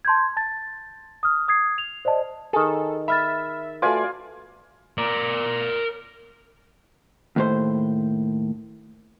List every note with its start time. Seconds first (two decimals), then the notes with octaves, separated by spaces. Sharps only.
0.05 A5 C6 G6 G#6
0.37 A5 A6
1.23 D#6 F6
1.48 D#6 G#6 C7
1.78 F7
2.05 C5 D5 D#5 A5
2.53 D#3 G#4 A4
3.08 E5 B5 F6 A6
3.82 A3 F4 F#4 B4 D5 F5 G#5
4.98 A#4 D5
7.36 D#2 A2 C5